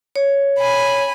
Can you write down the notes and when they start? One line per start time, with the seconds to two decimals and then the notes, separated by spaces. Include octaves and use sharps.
0.16 C#5
0.59 G#5 B5